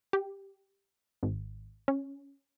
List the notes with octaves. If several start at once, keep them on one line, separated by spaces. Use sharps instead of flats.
G4
G#1
C#4